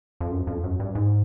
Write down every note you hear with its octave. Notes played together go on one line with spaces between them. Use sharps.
F2
F#2
F2
F#2
G2
G#2